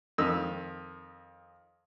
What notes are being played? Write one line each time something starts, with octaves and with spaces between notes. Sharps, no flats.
F2 D#3 E6